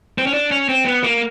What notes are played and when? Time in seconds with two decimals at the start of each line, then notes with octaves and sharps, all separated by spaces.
0.18 C4
0.27 C#4
0.34 D4
0.51 C#4
0.69 C4
0.86 B3
1.04 A#3